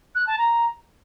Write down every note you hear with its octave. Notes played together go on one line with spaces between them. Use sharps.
F#6
A5
A#5